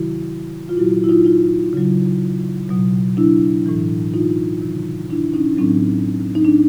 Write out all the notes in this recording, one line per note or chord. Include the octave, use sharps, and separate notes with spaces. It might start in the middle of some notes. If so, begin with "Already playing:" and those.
Already playing: C3 D#3 F#3 E4 F#4
F4
A#2 F#3 E4 F#4
E4
D#4 F4
D#4 F4
C#3 F#3
B2 F#3
D4 E4
A2 E3
D#4 F4
C3 D#3 F#3
D4 E4
C#4 D#4
A2 F#3 C4 D4
D#4
D4